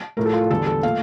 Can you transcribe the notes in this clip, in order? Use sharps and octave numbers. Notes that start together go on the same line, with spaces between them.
A2 F3 A3 A#4
A4
F4
E2 D3 G3 A4
A4
A#2 A3 F5